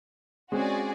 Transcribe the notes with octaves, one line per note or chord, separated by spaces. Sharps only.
G#3 C4 C#4 F#4 G#4 D5